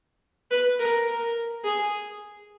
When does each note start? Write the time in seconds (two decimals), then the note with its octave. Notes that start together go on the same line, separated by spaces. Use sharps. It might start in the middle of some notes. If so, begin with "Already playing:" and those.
0.51 B4
0.79 A#4
1.08 A#4
1.64 G#4